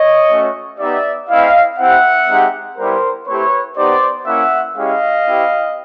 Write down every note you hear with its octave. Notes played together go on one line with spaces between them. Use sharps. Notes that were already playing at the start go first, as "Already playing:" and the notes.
Already playing: C#5 D#5
A3 C#4 F#4
B3 D#4 G4 D5 E5
A3 C4 E4 D#5 F5
C4 E4 G4 E5 F#5
G#3 C4 D#4 G4
G3 B3 E4 G4 A#4 C5
A3 C4 E4 G4 B4 C#5
B3 D#4 G4 C5 D5
A#3 C#4 E4 E5 F#5
G#3 C#4 E4 G4 D#5 F5
C4 E4 G4